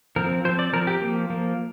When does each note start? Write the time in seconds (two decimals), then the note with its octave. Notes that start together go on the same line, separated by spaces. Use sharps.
0.16 F3 C4 A#4
0.45 F3 C5
0.49 C4
0.59 D5
0.73 F3 A#4
0.76 C4
0.87 G4
1.02 F3 A#3
1.30 F3 A#3